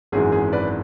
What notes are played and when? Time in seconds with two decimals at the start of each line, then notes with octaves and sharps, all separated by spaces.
0.12 G#1 F#2 E3 G#3 G#4
0.32 G#4
0.53 B4 D5